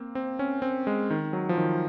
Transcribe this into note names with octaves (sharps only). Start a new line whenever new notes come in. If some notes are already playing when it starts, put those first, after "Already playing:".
Already playing: A#3 C4
C4
C#4
C4
G#3
D#3
F#3
F3
D#3